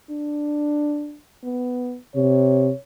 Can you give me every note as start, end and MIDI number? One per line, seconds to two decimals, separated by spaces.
0.10 1.17 62
1.44 1.98 59
2.16 2.71 48
2.16 2.78 73